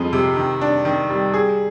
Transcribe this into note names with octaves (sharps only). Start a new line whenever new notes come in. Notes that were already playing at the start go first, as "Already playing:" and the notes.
Already playing: F2 F3 G#3
C3
D#3
D4
D#3
G3
G#4